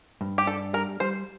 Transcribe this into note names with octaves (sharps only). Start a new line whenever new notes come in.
G2
G4
D4 A4
G3 A#4
G3 C5